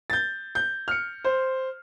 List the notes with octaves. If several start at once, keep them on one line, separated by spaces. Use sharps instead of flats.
G6 A6
G6
F6 C#7
C5